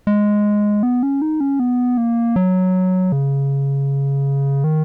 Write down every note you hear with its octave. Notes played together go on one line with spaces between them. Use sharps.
G#3
B3
C#4
D#4
C#4
B3
A#3
F#3
C#3
D#3